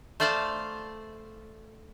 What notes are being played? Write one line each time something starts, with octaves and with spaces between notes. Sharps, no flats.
A3 C5 D5 F5 A5